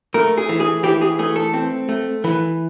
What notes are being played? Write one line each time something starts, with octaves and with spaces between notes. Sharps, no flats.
A3 A#4
G#4
E3
G#4
E3 G4
G#4
A3 G#4
A4
C4
A3
E3 B4